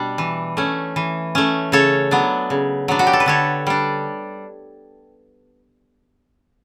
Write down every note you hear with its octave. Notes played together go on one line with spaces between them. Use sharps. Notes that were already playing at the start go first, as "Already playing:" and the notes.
Already playing: B2 G3 D4
E3
A3 C#4
E3
A3 C#4
C#3 A4 C#5
F#3 B3 D4
C#3
F#3 B3 D4
F#4
G4
A4
B4
D3 A4 C#5
G3 D4